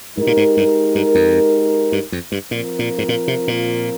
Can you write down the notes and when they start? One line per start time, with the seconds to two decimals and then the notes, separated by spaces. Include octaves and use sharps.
0.17 G#2 G#3 D#4 G4 A#4
0.27 A#2
0.37 G#2
0.57 G2
0.95 G2
1.15 F2
1.92 G2
2.12 F2
2.32 G2
2.51 A#2 F3 C4 F4 A#4
2.79 A#2
2.98 G#2
3.09 A#2
3.28 C3
3.48 A#2